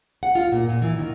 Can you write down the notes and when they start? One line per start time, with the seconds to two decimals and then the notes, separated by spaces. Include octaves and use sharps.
0.23 F#5
0.35 F4
0.52 A#2
0.69 A#2
0.82 E3
0.99 D#3